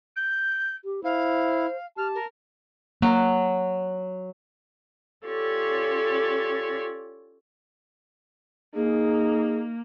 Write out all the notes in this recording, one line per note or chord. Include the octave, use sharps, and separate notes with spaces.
G6
G4
E4 C5 F5
G4 A5 F6
A#4
F#3 A#3
C#4 F4 G4 A4 C#5 D5
A#3 D#4 G#4